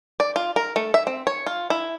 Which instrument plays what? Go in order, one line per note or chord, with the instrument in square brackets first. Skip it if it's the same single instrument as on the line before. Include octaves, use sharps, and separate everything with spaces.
[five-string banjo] D5
F4
A#4
A3
E5
C4
C#5
F4
E4